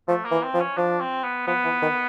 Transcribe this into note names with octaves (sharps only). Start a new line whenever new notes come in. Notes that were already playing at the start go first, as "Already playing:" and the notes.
F3 A3
A#3
E3
C4
F3
C#4
F3 D4
C4
B3
F3 B3
E3
D#3